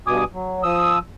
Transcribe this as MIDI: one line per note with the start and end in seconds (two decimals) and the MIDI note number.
0.07 0.24 43
0.07 0.24 47
0.07 0.24 80
0.07 0.24 86
0.07 0.24 87
0.33 0.63 54
0.63 0.98 53
0.63 0.98 87
0.63 0.98 88